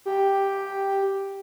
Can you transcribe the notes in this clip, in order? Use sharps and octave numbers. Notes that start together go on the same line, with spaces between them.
G4